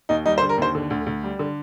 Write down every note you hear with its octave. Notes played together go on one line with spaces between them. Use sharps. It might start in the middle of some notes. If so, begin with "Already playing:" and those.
D#2 D#4
G3 D#4
C5
D3
A#4
D#2 C5
D3
D2
D2
G3
D3